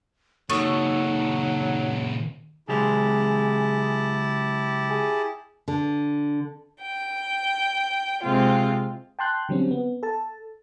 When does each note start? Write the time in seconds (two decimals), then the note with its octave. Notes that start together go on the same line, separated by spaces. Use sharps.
0.50 A#2 C#3 F#3 A3 D#4 D#5
2.69 C#3 F#3 G#3 E4 G4 G#4 A5
4.90 G#4
5.68 D3
6.82 G5
8.24 C3 G#3 C4 F4
9.19 G5 A5 C6 F#6 G6
9.49 D3 F#3 G3 C4 C#4
9.71 B3
10.03 A4 A5